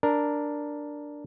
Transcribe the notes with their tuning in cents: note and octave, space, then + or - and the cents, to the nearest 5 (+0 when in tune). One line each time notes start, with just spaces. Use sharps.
D4 +0 A#4 +0